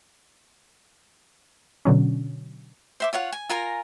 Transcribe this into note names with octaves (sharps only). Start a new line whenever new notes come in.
B2 D3 F#3 C#4
C5 E5 D6
F4 C#5 F5 F#5
G#5
F4 A#4 G#5 A#5